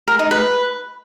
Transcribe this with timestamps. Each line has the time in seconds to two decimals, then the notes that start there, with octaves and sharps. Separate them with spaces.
0.08 A#4
0.19 D#4
0.31 B4